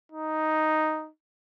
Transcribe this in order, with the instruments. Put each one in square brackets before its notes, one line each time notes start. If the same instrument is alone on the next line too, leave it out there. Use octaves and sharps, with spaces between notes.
[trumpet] D#4